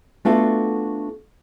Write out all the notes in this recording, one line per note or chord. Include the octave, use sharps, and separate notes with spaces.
A3 B3 D4 F4 F#4 A4